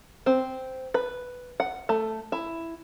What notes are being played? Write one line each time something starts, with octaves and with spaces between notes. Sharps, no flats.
C4
B4
F#5
A3
E4